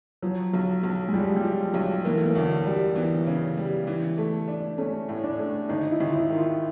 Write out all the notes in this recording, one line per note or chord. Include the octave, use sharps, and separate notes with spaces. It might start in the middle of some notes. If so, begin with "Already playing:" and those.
F3 F#3
B1
B1
G#3
F3 G3
G3
F3
B1
E3 A#3
A3
A#3
D2
G3
E3 B3
C#3
G3
E3
A3
D4
A3 C#4
A2
D4
A3
G#1 D#4
E4
G#1
F4
E4
D#3
F4